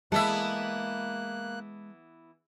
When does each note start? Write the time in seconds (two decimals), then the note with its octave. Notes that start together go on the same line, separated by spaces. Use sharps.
0.12 E3 G#3 A#3 B3 A4 E5 F#6